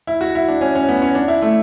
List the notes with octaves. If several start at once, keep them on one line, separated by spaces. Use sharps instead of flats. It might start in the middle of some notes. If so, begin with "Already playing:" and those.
E4
F#4
E4
D4
C#4
C#4
B3
C#4
D4
E4
A3